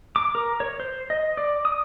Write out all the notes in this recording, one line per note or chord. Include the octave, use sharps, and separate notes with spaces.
D6
A#4
C#5
C5
D#5
D5
D#6